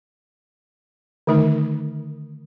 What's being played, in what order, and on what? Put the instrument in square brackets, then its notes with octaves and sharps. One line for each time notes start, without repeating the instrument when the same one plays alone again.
[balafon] D3 D#3 A3 D#4 A#4